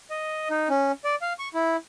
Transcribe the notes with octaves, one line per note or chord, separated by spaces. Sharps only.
D#5
D#4
C#4
D5
F5
C#6
E4